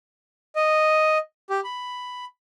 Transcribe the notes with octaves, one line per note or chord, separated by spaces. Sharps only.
D#5
G4
B5